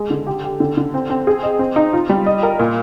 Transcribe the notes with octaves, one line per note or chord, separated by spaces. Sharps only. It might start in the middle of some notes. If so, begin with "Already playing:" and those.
Already playing: G#3
D3
G4
G4
D3
D3
C4
C4
G#4
D#5
C4
D#4
F4
G3
D#5
A#4
A#2